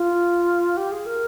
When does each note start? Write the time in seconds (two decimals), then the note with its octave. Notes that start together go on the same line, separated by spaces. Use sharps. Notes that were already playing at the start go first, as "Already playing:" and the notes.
Already playing: F4
0.77 G4
0.92 G#4
1.06 A#4